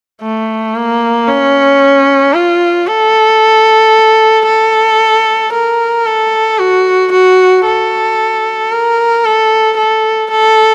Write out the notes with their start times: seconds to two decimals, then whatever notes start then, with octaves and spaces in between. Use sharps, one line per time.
0.22 A3
0.75 A#3
1.27 C#4
2.34 F4
2.87 A4
4.46 A4
5.53 A#4
6.06 A4
6.59 F#4
7.12 F#4
7.66 A4
8.72 A#4
9.25 A4
9.77 A4
10.31 A4